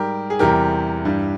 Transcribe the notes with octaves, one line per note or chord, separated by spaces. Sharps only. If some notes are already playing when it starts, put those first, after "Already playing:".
Already playing: G#2 G3 G4 A#4
G#4
E2 C3 E3 G3 G4 A#4
G2 E3 G3